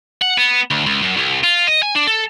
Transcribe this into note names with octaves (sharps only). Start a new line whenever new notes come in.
F#5
B3
D2
C#2
F#2
C2
F4
D#5
G#5
D4
A4